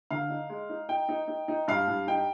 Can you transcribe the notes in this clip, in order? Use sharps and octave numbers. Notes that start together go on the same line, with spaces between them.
D3 F5
D#4
G#3
D#4
D#4 G5
D#4
D#4
D#4
G2 F5
G2
D#4 G5